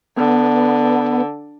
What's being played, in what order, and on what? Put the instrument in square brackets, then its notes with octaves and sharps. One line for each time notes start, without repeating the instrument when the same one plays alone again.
[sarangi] D3 [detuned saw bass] B3